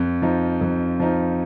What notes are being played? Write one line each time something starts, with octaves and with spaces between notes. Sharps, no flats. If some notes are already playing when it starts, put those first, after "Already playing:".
Already playing: F2
F3 D#4
F2
F3 D#4